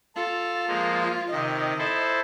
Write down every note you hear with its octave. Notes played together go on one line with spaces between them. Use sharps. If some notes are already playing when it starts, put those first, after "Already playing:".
F4 A4
F3 G#3 A#3
C3 D#3 D#5
E4 A4 C5